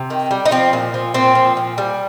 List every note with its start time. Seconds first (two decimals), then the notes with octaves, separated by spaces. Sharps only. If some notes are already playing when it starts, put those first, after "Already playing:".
Already playing: C3
0.10 D#3
0.31 G3
0.46 D#4
0.51 F3 C4
0.73 A#2
0.94 F3
1.14 A#2 C4
1.35 F3
1.57 A#2
1.78 G3